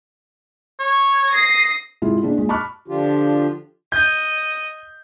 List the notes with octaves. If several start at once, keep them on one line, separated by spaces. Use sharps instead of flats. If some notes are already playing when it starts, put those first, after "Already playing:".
C#5
D#6 A#6 C7
G#2 C3 E4 F4 G#4
A#2 C#3 C4 D4
A#2 G#3
A5 B5 C#6 D6 F6 F#6
D3 F3 D4 F4 G4
D#5 G6